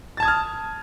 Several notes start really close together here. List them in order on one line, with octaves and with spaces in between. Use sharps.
A6 A5 G#6 D#6 F6